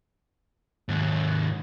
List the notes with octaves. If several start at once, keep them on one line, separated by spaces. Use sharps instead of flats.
D#2 G#2